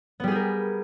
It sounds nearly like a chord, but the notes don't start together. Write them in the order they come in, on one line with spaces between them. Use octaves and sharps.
B3 G3 G#4 G4 A#4